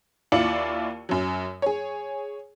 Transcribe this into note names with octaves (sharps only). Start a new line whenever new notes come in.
D#2 E4 F4 D5 C#7 F#7
F#2 F#3
G#4 C#5